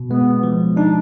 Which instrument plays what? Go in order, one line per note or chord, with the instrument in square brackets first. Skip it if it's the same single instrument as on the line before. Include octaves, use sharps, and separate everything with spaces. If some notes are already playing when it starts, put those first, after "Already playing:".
Already playing: [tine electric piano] B2
[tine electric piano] G#3 [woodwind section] B3
[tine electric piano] F3
[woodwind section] D4 [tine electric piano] D#4